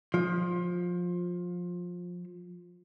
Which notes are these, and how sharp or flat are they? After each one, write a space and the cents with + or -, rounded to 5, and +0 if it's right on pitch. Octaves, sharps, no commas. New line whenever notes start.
F3 +20